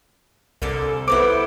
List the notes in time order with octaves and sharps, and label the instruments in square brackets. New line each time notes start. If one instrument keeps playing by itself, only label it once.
[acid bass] C2 [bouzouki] D3 A4 A#4
[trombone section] B3 B4 [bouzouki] E4 A4 C5 [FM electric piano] D6